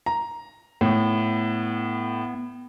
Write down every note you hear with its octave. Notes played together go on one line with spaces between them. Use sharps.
A#5
A2 B3